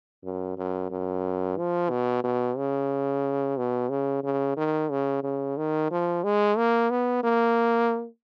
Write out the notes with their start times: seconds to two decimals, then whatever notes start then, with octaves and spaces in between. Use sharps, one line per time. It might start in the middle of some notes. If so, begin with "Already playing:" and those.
0.24 F#2
0.57 F#2
0.91 F#2
1.57 F3
1.90 B2
2.24 B2
2.57 C#3
3.58 B2
3.90 C#3
4.24 C#3
4.57 D#3
4.91 C#3
5.23 C#3
5.57 D#3
5.91 F3
6.24 G#3
6.58 A#3
6.90 B3
7.23 A#3